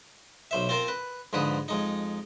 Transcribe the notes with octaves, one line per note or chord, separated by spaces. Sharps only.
B1 C5 E5
C4 F4 A#4 C5
B4
G#2 D3 F3 B4 D#6
F2 G#3 D#4